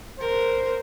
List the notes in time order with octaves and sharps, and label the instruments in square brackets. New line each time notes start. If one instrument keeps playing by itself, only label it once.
[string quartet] A#4 [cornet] C5